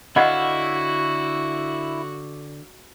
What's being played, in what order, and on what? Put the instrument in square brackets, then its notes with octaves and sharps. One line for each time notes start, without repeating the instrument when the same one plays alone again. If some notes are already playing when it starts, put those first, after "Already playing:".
[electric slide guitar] D3 C#5 F5 [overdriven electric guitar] E4 [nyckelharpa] F#4 [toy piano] D#5 F#5 B5